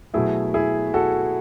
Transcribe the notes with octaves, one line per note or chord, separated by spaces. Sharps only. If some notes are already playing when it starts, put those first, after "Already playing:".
B2 F#3 A3 E4 G#4
E4 G#4
F#4 A4